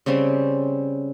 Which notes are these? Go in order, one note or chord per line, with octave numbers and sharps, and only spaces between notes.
C#3 G3 C4 C#4